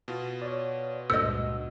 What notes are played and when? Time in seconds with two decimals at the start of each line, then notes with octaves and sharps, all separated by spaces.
0.08 B2 F4
0.42 C#5 D5
1.10 C#2 G2 A#2 C5 D#5 E6